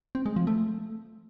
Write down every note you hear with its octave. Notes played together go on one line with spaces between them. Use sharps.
C4
G#3
F3
A3